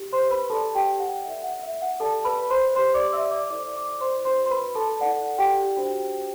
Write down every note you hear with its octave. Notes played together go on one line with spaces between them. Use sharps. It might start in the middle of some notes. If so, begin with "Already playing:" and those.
Already playing: G4
C5 C6
B4 B5
G4 A4 B4 D5 A5
G4 G5
F#5
E4 A4 D5 E5
F#5
E5
F#5
G4 A4 D5 A5
B4 B5
C5 C6
G4 C5 C6
D5 D6
E5 E6
D5 D6
E4 A4 C5 D5 D6
D5 D6
C5 C6
D4 F#4 B4 C5 D5 C6
C6
B4 B5
A4 A5
E4 A4 D5 F#5
G4 G5
D4 F#4 C5